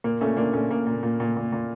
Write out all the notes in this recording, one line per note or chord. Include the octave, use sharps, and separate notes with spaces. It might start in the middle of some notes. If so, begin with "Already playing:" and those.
A#2 A#3
A#2 A3 C#4
A#2 A#3 D4
A#2 A3 C#4
A#2 A#3
A#2
A#2
A#2
A#2
A#2